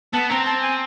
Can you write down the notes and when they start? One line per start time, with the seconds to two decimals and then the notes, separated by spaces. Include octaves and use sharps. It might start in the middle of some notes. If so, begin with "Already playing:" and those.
0.13 B3 A5
0.30 C4 A#5
0.45 A5
0.62 G#5